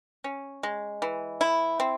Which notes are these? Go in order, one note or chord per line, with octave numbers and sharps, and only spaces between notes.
C#4
G#3
E3
E4
C4